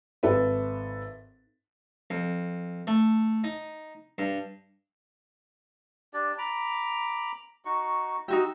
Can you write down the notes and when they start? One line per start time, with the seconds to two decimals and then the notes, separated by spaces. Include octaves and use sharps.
0.23 G#1 A4 B4 E5
2.10 F2
2.87 A3
3.44 D#4
4.18 G2
6.14 D4 G4 D5
6.38 A#5 B5 D6
7.65 D#4 F#4 C#6
8.28 D#4 F#4 G4 E6